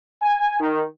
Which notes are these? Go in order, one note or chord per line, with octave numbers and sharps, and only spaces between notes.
G#5
D#3